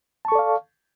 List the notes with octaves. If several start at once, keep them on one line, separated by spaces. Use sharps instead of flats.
A4 D5 F5 A5 C#6